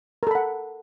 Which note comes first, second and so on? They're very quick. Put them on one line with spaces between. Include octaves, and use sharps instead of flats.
A#4 A4 B5 F#5